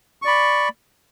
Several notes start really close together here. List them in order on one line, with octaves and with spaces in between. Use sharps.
C#6 D5 B5